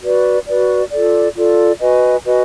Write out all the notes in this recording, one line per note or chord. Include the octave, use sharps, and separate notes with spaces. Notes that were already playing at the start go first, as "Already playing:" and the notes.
F#4 B4 D5
F#4 B4 D5
F4 A4 D5
F4 A4 D5
F#4 B4 D#5 G#5
F#4 B4 D#5 G#5